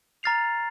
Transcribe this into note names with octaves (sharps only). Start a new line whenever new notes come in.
A#5 F6 A6 C7 F7